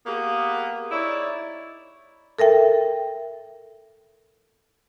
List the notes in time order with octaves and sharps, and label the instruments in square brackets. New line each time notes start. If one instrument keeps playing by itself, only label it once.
[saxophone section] A#3 B3 G4 G#4
D#4 E4 C#5 D5
[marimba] A4 A#4 E5 G5